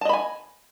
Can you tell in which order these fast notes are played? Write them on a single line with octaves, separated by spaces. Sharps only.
A5 D#5 B5 G#5